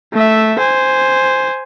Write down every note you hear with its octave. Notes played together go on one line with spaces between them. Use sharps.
A3 E5
C5 G#5